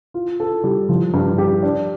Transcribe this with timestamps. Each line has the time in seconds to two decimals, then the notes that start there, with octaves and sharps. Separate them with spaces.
0.14 F4
0.40 A4
0.64 G3
0.89 F3
1.14 G2
1.38 G4
1.63 D4